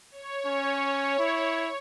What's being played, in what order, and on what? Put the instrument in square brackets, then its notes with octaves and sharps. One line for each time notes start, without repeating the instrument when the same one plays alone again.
[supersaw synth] C#5
[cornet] C#4
E4